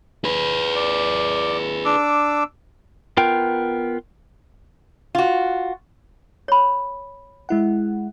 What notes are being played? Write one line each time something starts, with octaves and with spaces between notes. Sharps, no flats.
G#4 B4
D5
D4 D6 E6
B3 F4 A#4 G5
F4 F#4
C#5 B5
G#3 E4 F#5